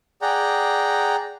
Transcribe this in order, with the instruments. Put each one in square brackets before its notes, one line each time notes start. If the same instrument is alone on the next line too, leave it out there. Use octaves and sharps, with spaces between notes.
[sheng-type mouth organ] G#4 D5 F#5 G5 A#5